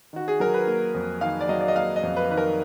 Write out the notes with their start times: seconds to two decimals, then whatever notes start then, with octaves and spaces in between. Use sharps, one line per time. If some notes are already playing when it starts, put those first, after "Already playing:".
0.13 D#3 F#4
0.28 G#4
0.40 F#3 A#4
0.54 B4
0.67 A#3
0.94 F2
1.21 D#3 F5
1.41 D5
1.49 F#3 D#5
1.61 D5
1.68 D#5
1.75 A#3 F5
1.96 D#5
2.03 F2
2.16 B4
2.30 D#3 B4
2.37 A#4